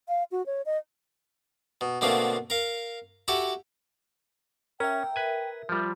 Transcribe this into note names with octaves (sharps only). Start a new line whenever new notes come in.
F5
F#4
C#5
D#5
B2
B2 D3 A3 A#3 C4 F4
A#4 F5
E4 F#4 G4 A4
C#4 A#4 E5 G5
B4 G#5
F3 G3 F4